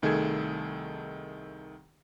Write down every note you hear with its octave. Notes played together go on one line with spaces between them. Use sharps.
C2 D#3 A3 G#4 A4 G#6